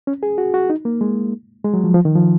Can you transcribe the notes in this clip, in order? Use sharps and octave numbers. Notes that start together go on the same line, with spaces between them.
C#4
G#4
F#4
F#4
D#4
A#3
G#3
G#3
F#3
F3
F3
D#3
F3